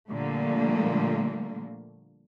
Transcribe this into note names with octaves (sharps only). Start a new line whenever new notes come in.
A#2 D3 F3 G3 A3 A#3